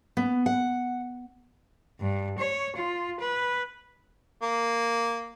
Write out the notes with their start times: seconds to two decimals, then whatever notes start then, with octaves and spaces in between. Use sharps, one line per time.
0.17 B3
0.46 F#5
2.00 G2
2.39 C#5
2.76 F4
3.20 B4
4.42 A#3